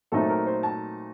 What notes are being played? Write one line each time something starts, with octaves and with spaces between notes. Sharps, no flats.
A#2 F#3 A3 C4 D#4 A4
A#4
C5
A5